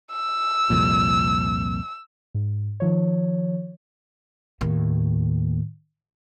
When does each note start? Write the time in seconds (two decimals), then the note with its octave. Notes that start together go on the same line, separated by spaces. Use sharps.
0.12 E6
0.70 C2 F2 A#2
2.34 G#2
2.80 D#3 F3 C#5
4.61 D#2 A2